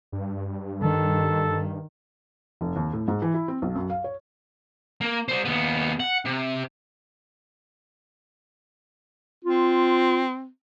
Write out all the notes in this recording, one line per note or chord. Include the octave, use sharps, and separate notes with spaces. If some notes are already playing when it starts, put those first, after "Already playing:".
G2
D#3 A4
F1
D#2
A2
G#2
E3
E4
C4
B1
F#2
F5
C#5
A#3
G3 C5
D#2 B3
F#5
C3
C4 F4